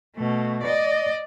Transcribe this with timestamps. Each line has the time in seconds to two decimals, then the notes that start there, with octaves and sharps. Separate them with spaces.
0.16 B2 A3
0.63 D5 D#5